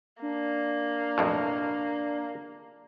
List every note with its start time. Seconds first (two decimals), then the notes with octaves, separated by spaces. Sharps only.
0.22 A#3 D4
1.18 B1 F2 A2